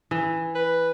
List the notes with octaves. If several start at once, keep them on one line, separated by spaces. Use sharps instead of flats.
E3
B4